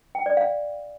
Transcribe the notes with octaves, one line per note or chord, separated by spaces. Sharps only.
G5
D5
F5